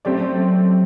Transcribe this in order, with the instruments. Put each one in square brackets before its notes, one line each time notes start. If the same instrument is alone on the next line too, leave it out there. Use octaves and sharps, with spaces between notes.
[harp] F#3 [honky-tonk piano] A3 C4 G4 D5